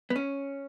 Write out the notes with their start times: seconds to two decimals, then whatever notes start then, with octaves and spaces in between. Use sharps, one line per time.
0.10 B3
0.16 C#4